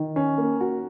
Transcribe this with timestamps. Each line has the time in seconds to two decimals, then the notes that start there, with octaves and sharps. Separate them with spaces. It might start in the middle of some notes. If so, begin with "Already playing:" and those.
Already playing: D#3
0.16 C#4
0.38 A#3
0.61 F#4